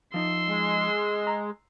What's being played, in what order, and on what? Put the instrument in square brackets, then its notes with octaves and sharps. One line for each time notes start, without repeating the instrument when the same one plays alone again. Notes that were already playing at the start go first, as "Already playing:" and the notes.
[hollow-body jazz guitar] F3 D#4 [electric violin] C6 E6
[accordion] G#3
[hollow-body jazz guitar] A#5